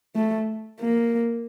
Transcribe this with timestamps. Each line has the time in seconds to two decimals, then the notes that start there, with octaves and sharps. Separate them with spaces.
0.16 A3
0.80 A#3